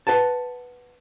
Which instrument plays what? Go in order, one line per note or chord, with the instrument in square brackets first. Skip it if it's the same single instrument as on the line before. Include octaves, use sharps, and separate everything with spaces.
[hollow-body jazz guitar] B4 F#5 A5